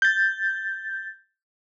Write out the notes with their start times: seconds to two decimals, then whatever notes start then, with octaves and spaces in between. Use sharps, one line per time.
0.02 G6 A6